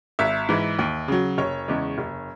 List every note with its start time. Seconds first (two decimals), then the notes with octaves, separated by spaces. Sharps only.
0.19 G#1 E5
0.49 G#2 E3
0.79 D#2
1.08 C#3 F#3
1.38 F#1 C#5
1.68 E2 C#3 G#3
1.98 F#1